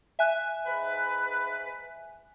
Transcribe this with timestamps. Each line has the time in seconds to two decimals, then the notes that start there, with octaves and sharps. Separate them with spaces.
0.19 E5 G#5 F#6
0.66 G#2 B4